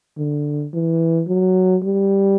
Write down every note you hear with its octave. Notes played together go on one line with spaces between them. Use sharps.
D3
E3
F#3
G3